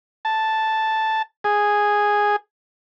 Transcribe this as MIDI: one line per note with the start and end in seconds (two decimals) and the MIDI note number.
0.25 1.22 81
1.44 2.36 68